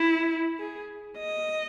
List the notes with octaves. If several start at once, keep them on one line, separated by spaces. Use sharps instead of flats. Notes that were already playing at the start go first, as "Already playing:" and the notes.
Already playing: E4
G#4
D#5